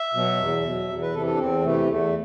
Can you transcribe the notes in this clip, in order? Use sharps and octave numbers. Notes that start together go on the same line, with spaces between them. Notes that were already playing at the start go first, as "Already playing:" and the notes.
Already playing: E5
B2 F#3
E2
B2 F#3
E2
B4
C3 E3 A4
A4
D4
E2 C4
C3 E3 A3
E2 A3